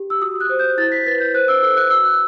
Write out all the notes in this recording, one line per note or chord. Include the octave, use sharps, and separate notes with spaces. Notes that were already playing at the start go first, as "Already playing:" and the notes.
Already playing: G4
E6
F#4 D#6
F#6
C5
G6
E4 A6
B6
B4 A6
G6
C5 F#6
E6
A4 E6
F#6
F#4 E6
F#6